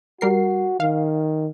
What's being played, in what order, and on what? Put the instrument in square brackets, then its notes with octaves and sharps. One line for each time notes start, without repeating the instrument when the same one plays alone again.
[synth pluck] G3 A#4 C7 [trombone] F#4
[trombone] D#3 [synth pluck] F5